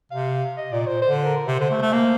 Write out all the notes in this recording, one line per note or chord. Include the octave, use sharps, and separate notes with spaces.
C3 F5
D#5
A#2 D5
A#2 C5
D3 C5
A#4
C3 C5
D3
A3
A3
A#3